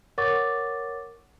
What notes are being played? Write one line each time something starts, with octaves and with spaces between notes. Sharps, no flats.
A#4 C#5 F#5 C#6 D6 A6